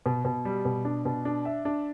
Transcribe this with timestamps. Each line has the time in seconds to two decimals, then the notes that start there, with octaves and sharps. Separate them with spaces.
0.06 B2
0.25 B2
0.45 G3
0.65 B2
0.85 D4
1.05 B2
1.25 D4
1.45 E5
1.65 D4